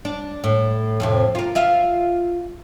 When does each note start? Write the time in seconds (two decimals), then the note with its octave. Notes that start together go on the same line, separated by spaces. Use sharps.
0.05 D4
0.44 A2
1.00 F2 A2 C3
1.35 F4 A#4
1.55 F4 E5 F5